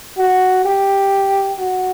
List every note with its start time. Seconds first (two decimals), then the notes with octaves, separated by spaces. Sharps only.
0.18 F#4
0.65 G4
1.59 F#4